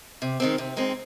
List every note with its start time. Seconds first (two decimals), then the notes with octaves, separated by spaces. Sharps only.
0.22 C3
0.40 D#3 G#3 C4
0.58 C3
0.76 D#3 G#3 C4